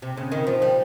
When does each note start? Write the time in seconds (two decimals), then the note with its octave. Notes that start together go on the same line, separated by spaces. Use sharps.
0.02 C3
0.17 C#3
0.32 D#3
0.47 F3
0.62 G3